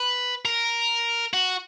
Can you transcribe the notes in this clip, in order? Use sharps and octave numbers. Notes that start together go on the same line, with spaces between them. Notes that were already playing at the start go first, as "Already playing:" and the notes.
Already playing: B4
A#4
F#4